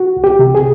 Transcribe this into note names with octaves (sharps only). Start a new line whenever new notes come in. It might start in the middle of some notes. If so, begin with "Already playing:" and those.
Already playing: F#4
C2
G4
C3
G#4